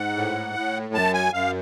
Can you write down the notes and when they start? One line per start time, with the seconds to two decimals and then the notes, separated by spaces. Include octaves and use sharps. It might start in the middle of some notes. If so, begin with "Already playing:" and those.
Already playing: G#2 F#5
0.16 A2
0.55 A2
0.94 F#2 A5
1.14 G#5
1.33 F#2 F5